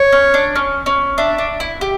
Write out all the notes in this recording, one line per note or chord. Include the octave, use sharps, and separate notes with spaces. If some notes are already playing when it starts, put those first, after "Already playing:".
Already playing: C#5
C#4
D4
C#4
C#4
D4 E5
D4
E4
G4